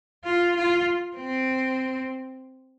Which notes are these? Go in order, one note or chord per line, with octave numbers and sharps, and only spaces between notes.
F4
F4
C4